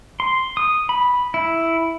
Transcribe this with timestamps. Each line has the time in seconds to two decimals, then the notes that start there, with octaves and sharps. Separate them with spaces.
0.20 C6
0.57 D#6
0.89 B5
1.34 E4